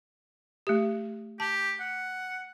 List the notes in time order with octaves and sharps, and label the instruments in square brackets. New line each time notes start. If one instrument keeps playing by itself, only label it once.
[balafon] A3 G4
[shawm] G4 [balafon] A5
[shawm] F#5